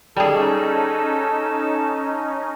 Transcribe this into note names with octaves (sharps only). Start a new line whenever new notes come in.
G3 C#4 D#4 G#4 A4 A5